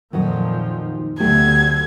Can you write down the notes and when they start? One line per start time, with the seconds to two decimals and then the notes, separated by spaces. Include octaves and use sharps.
0.13 F2 A#2 D#3 F3 F#3 D#5
1.20 D2 D3 F#3 A3 B3 G4 G#6